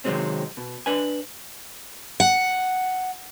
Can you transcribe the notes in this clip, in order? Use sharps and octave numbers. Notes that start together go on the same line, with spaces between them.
C3 D#3 F#3 G#3 C4 C#4
B2
D4 B4 G#5
F#5